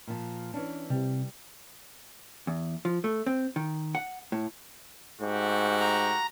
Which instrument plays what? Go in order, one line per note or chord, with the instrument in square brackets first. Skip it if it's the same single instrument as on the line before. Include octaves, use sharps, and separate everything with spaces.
[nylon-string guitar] A#2 F3
E3 C#4 D4
[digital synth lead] C3 [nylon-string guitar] G3
[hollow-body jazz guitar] E2
F3
A3
C4
D#3
F#5
A2
[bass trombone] G#2 [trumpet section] A3 F#4 G4
[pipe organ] A#5